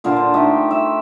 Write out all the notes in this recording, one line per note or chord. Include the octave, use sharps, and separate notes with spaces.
A#2 D3 D4 F4
C5
A3 D#4 G4
E5